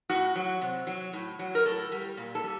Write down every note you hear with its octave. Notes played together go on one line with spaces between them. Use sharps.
A2 F#4
F#3
C3
F#3
A2
F#3
A#4
A2 A4
G3
A#2
A4
G3